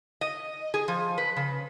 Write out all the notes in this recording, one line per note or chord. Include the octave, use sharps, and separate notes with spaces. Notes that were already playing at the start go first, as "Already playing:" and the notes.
D#5
G#4
F3
B4
C#3